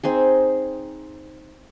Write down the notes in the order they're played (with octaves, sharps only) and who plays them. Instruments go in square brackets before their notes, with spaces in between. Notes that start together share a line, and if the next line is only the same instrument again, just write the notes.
[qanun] C4 D#4 G#4